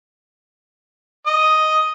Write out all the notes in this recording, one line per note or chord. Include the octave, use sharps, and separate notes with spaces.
D#5